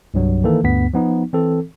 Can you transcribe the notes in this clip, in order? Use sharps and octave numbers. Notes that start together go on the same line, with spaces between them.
C2 G2 F#3
D#3 E3 A#3 A4
D2 G2 B3 B6
F3 B3 D#4
E3 C4 A4